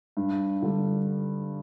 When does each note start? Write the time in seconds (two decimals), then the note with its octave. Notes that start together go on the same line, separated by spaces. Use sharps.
0.17 G2
0.62 D3 G3